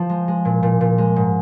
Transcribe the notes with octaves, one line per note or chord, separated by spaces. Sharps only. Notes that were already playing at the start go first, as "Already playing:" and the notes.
Already playing: F3
G#3
G#3
A#2
A#2
A#2
G#3
G#2